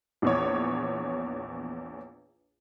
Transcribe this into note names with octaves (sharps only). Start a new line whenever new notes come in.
A#1 E2 C#5